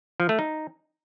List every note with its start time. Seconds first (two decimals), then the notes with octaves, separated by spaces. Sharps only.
0.20 F3
0.29 A3
0.39 D#4